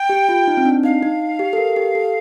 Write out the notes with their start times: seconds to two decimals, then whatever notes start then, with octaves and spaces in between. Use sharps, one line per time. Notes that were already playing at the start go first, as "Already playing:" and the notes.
Already playing: G5
0.09 G4
0.29 F4
0.47 D#4
0.57 C4
0.65 D4
0.83 D#4 F5
1.03 D#4
1.39 G4
1.53 A4
1.58 A#4
1.76 G4
1.95 A4